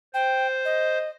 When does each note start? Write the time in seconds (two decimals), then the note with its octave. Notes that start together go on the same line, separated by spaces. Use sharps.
0.14 C5 G5
0.65 D#5